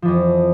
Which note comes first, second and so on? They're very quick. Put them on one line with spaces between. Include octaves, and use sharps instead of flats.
F3 E3 F2